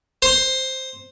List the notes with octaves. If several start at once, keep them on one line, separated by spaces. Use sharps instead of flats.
C5